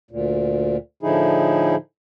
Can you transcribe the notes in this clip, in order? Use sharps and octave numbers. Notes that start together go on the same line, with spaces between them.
D2 A#2
A2 D3 F3 D#4 E4 G#4